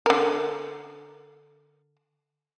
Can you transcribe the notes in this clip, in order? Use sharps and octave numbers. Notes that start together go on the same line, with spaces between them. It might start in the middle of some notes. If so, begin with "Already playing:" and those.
D3 A#4